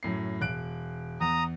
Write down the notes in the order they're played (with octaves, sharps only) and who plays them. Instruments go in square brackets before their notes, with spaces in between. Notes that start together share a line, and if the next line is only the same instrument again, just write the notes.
[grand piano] F#2 A2 C7
E1 F#6 D7
[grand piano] E2 [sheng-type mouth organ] A#5 D#6